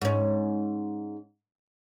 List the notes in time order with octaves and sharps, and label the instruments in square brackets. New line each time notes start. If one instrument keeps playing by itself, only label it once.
[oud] G#2 C#4